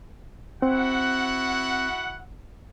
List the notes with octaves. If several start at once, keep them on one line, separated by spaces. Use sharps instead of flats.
C4 E4 F#4 F#5